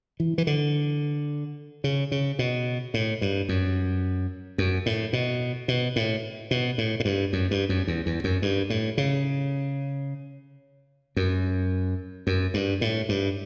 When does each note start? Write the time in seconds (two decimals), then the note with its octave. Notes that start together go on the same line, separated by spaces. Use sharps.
0.20 E3
0.38 E3
0.47 D3
1.84 C#3
2.12 C#3
2.39 B2
2.94 A2
3.21 G2
3.49 F#2
4.58 F#2
4.86 A2
5.13 B2
5.68 B2
5.96 A2
6.51 B2
6.78 A2
7.00 A2
7.05 G2
7.33 F#2
7.51 G2
7.69 F#2
7.87 E2
8.06 E2
8.24 F#2
8.42 G2
8.70 A2
8.98 C#3
11.16 F#2
12.27 F#2
12.54 G2
12.81 A2
13.09 G2